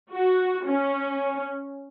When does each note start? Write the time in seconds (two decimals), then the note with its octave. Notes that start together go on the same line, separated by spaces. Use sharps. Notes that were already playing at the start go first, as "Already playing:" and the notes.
0.11 F#4
0.65 C#4